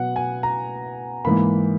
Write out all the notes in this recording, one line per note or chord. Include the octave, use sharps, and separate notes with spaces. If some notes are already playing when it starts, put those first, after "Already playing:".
Already playing: B2 F#3 B3 F#5
G#5
A#5
G#2 E3 A#3 B5